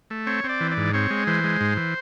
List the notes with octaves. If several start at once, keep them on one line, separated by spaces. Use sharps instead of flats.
A3
C4 C#5
C4
D5
E3
D5
G#2
C4 C#5
G#3
E3 C5
G#3
G#2
E3